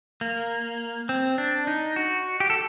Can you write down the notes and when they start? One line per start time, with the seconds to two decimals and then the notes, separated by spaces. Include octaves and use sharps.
0.21 A#3
1.09 C4
1.38 D4
1.67 D#4
1.96 F#4
2.40 G4
2.50 A4